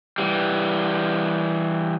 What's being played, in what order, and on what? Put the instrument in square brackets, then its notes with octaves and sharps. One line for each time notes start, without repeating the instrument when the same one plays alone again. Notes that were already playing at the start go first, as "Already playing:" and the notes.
[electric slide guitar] E3 G3